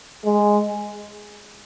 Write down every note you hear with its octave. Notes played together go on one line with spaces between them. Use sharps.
G#3